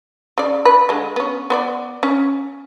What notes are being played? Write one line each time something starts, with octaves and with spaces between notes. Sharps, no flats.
C#3 D5
B4
D3 G#3
B3 C#4
B3 C5 D5
C#4